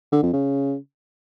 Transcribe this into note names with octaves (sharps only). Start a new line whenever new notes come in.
D3
F2
C#3